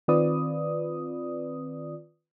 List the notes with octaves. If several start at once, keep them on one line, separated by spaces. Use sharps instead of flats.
D#3 C4 F4 B4 D5 D#6